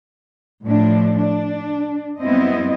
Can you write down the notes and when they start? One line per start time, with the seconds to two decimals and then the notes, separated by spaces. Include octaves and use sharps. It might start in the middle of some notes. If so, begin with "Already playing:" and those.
0.65 A2 F3 D4
1.17 D4
2.21 F#2 G3 B3 C4 E4 D#5